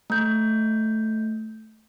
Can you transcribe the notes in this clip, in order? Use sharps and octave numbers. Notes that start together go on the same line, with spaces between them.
A3 G6